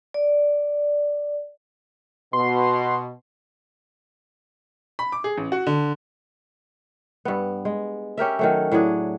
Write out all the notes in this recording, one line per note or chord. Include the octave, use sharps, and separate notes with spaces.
D5
B2 C6
B5
D6
G#4
A1
F#4
D3
G2 B3
G#3
C#4 G4 A#4 E5
D#3 F#3 A3
A2 F#3 D4 G#4